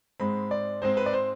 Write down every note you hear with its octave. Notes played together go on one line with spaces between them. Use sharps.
G#2 G#3 C4 B5
D5
G#2 G#3 C4 C5
B4
D5
C5